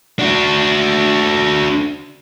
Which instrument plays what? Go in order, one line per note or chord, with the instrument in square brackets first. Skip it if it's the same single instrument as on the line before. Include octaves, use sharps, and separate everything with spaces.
[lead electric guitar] D4 F#4